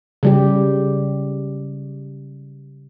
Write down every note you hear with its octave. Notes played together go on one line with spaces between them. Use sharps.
C#3 G3 G4